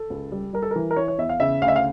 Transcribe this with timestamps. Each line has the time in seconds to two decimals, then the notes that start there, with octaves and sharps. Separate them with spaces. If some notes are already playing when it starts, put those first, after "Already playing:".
Already playing: A4
0.10 C#2
0.32 G3
0.53 G3 A#4
0.62 A4
0.71 E3 A#4
0.91 A#4
0.96 E3 C#5
1.08 C#5
1.18 E2 E5
1.29 F5
1.40 C#3 E5
1.62 D2 F5
1.68 E5
1.76 F5